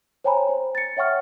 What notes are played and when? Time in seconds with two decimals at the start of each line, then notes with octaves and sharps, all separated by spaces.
0.24 C5 C#5 G5 G#5 A#5 B5
0.49 C5
0.75 A6 C#7
0.97 C#5 E5 F#5 G5 C#6 F6